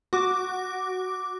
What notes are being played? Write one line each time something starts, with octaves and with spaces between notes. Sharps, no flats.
F#4 D6